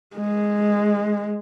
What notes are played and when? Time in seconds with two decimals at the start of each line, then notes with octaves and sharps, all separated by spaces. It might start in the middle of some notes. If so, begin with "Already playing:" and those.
0.17 G#3